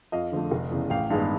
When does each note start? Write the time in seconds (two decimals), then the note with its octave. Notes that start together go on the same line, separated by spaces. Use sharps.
0.12 F2 D#5 F5
0.32 D3 F3 A3
0.51 F1
0.71 E2 C#3
0.90 A1 F5 G5
1.10 G2 D#3 G#3 B3